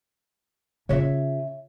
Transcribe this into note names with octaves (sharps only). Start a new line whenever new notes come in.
C#3 F4 C#5 E5